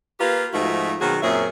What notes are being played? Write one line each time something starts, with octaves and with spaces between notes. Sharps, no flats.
A#3 F4 G4 A#4 B4
G#2 F3 A3 D#4 F4 F#4
B2 D#3 F#3 C4 F#4 G#4
F#2 A#2 C4 G#4 C#5 E5